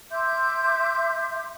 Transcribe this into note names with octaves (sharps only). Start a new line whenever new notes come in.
E5 C6 D6 G6